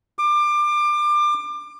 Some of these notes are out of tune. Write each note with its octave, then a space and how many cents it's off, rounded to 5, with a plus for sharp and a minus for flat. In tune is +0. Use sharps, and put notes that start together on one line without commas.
D6 +25